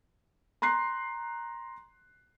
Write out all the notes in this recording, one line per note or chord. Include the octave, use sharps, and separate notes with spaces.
A#5 C6 F#6 C7